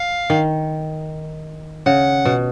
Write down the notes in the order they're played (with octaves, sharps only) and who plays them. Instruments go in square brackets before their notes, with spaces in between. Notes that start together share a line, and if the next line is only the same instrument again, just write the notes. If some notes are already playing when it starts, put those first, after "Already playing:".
Already playing: [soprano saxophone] F5
[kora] D#3
[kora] C#3 [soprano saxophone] F#5
[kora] B2